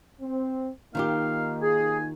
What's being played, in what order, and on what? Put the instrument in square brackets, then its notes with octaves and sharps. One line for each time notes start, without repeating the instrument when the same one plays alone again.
[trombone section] C4
[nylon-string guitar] D#3 F4 G4 [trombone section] A#3 D#4 [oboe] F5
[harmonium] G#4 [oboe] G#5